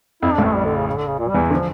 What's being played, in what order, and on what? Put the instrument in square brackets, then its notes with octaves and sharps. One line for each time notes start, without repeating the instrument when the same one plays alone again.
[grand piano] F2 [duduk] E4
[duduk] D4
[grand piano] A1 A2
[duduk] A3
G3
D3
C#3
C#3
D3
C#3
A#2
G3
[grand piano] E2 E3
[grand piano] D3 [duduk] F3